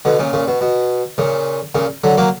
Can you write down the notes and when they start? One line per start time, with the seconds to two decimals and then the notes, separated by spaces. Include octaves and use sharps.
0.05 B2 D3
0.19 A#2 C#3
0.33 A#2 C#3
0.48 B2
0.61 B2
1.18 A#2 C#3
1.75 A#2 C#3
2.04 D3 F#3
2.18 F#3 A#3